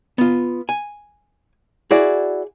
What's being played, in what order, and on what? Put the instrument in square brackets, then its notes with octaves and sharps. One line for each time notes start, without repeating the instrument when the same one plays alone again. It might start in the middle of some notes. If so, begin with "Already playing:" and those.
[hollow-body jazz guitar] B3 F4
G#5
[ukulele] E4 F#4 D5 [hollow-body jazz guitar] G#4